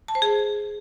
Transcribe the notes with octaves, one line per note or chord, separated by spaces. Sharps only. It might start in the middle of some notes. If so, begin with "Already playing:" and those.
A5
C5
G#4